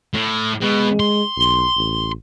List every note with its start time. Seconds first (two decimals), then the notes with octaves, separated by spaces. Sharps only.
0.14 A2
0.61 B2 G#3
1.00 C6
1.37 B1
1.76 A1